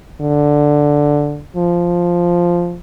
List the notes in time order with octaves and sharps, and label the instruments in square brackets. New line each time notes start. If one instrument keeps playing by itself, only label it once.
[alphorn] D3
F3